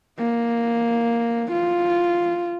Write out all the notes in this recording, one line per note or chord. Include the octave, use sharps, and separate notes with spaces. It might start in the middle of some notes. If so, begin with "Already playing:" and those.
A#3
F4